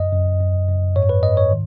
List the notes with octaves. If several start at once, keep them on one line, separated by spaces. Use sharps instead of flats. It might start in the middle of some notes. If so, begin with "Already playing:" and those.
Already playing: F#2 D#5
F#2
F#2
F#2
G#2 C#5
B4
G#2 D#5
C#5
D#3